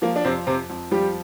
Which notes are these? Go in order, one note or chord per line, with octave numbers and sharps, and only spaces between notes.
F3 A#3
D4
F2 C3 C4
F2 C3 C4
F2
F3 G3 G4